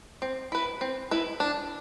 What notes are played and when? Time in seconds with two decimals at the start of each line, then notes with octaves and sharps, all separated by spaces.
0.22 C4
0.52 E4 B4
0.81 C4
1.11 E4 B4
1.40 D4